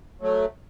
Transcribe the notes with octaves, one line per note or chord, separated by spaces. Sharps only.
F#3 A3